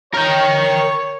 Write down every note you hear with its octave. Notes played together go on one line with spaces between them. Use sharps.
A#4 C#5 G5